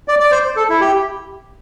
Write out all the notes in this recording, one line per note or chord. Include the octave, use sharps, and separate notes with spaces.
D5
D5
C5
A4
E4
G4